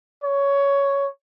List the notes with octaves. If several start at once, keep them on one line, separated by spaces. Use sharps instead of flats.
C#5